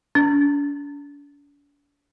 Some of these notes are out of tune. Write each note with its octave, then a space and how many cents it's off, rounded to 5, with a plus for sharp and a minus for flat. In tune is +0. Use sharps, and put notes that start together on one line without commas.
D4 -40